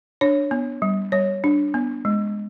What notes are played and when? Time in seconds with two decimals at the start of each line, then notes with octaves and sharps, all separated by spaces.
0.21 D4 C#5
0.51 B3
0.82 G3
1.12 G3 C#5
1.44 D4
1.74 B3
2.05 G#3